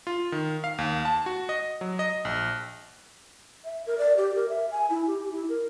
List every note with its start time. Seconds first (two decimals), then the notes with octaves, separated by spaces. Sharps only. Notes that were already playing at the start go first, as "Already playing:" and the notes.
0.07 F4
0.32 D#3
0.64 F5
0.78 D#2
1.05 A5
1.26 F#4
1.49 D#5
1.81 F#3
1.99 D#5
2.25 A#1
3.65 E5
3.87 A#4
3.98 D5
4.17 G4
4.35 A#4
4.49 E5
4.72 G#5
4.90 E4
5.07 G4
5.20 G4
5.32 E4
5.49 A#4